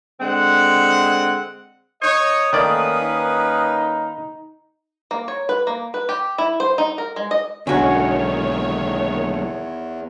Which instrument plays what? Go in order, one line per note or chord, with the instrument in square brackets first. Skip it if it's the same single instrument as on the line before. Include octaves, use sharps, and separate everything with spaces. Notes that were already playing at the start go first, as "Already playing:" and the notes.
[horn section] D3 G#3 C4 F#5
[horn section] D#4 C#5 [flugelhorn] D#5 [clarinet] D#6
[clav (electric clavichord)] D#3 D5 [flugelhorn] A3 [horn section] A#3 C#4 B4
[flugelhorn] D#4
[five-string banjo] A#3
C#5
B4
A#3
B4
G4
E4
C5
D#4
A#4
G#3
D#5
[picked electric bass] B1 D3 [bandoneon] E2 [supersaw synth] D#3 C#5 [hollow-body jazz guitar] C#4 F#4